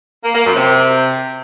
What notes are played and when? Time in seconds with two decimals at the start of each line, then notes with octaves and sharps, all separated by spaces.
0.23 A#3
0.34 A#3
0.44 F#2
0.55 C3